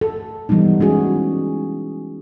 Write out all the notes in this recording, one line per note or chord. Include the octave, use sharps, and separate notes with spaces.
A4
E3 G3 G#3 B3 D#4
G#3 C#4 E4 F#4 G#4